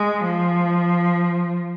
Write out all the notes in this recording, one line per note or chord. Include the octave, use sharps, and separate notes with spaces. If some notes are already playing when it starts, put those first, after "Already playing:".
Already playing: G#3
F3